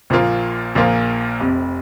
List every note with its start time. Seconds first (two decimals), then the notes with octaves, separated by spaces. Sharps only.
0.10 A#1 A#2 F3 A#3 F4
0.75 A#1 A#2 F3 A#3 F4
1.40 F1 F2 C3